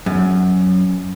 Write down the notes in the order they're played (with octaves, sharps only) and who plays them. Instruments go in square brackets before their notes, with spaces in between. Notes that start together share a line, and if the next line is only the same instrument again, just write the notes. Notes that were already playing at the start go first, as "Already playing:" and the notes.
[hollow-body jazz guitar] F#2